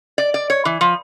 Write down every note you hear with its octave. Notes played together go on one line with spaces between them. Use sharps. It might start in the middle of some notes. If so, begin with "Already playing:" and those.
D5
D5
C#5
E3
F3